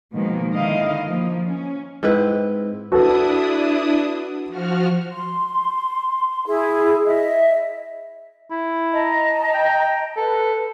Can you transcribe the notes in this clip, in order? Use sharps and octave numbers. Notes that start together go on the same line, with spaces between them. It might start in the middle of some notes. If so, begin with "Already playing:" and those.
B2 D#3 F3 G#3 A#3
D3 D#3 E4 D#5 F5
F3 A#3
C#4
G#2 C4 E4 B4
D4 E4 F#4 A4 B4 D#6
F3 F#4 F6
C6
E4 G#4
D#5 E5
E4
D#5 A5 A#5
G5
A4 B4